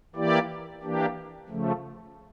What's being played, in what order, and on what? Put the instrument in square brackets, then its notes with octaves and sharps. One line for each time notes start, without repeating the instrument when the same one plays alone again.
[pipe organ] E3 A#3 E4 G4 D5
E3 A#3 D4 G4
C#3 F3 A3